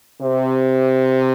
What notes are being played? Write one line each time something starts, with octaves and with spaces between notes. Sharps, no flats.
C3